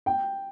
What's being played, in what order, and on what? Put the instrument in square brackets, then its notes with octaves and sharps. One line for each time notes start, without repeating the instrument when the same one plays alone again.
[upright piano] G5